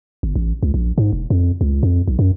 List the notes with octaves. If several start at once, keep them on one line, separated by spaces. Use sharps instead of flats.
G1
A1
C#2
A#1
G#2
E1
F2
C#2
F2
B1
F#2